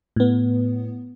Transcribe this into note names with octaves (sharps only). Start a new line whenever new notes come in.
A2 B3